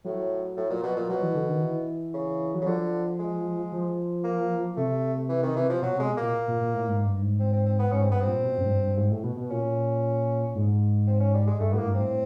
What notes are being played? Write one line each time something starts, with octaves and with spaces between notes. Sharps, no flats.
A2 F#3
A2
A#2
B2
A#2
B2 F#3
E3
D3
D#3
E3
C#3
F#3
C#3
D3 F3
G#3
F3
A#3
C3 A3
E3
D#3
E3
F3
B2 F#3
C3 G#3
B2
A#2 A#3
A#2
A#2
A2
G#2
G2
G#2
C4
C4
C4
B3
G#2 C#4
C4
G2 B3
C4
A#2
B2
F#2
G#2
G2
G2
G#2
A2
B2
B2
A#2 C#4
G#2
C4
C#4
G3
G#3
G2 A3
A2 A#3 B3
G2
A2 C4